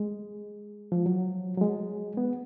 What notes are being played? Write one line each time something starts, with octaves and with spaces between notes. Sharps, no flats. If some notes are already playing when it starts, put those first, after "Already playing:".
Already playing: G#3
F3
F#3
F#3
G#3
B3